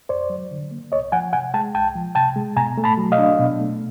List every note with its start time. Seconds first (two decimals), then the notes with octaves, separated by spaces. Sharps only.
0.09 F2 C5 D5
0.30 F#3
0.51 D3
0.71 A#3
0.92 C2 C#5 D#5
1.12 F3 F#5 G#5
1.33 C3 F#5 G#5
1.54 G#3 G5 A5
1.74 C2 G5 A5
1.95 F3
2.15 C3 G5 A5
2.36 G#3
2.57 B2 G#5 A#5
2.78 A3
2.84 A5 B5
2.97 F#3
3.12 D#5 F5
3.18 D4
3.39 B2
3.60 A3